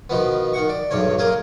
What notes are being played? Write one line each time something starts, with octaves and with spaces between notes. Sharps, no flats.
B2 D#3 F3 B3
D#3 F#5 C#6
D5
B1 E2 G2 C#4 C#5
A#3 F4 G#4 A#4